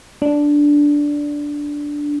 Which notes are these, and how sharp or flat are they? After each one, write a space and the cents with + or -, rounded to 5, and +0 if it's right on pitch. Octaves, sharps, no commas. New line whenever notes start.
D4 -5